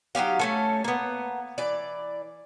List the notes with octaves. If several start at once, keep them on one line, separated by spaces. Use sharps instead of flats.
F#3 D#4 G4 F5
A3 C#4 A4
A#3 B3
E3 D5